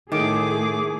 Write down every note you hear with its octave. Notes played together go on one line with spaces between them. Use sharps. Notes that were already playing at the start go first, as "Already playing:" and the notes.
A2 D#3 A3 G#4 D6